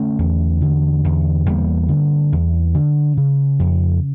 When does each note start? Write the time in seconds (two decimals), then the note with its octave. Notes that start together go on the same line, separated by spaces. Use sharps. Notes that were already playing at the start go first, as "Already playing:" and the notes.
Already playing: D3 A3 C#4
0.19 E2
0.61 D3
1.04 E2
1.46 E2 G3 A#3
1.89 D3
2.32 E2
2.75 D3
3.17 C#3
3.59 F2